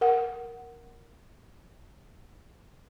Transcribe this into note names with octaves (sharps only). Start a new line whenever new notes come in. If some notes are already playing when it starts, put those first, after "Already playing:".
A#4 F#5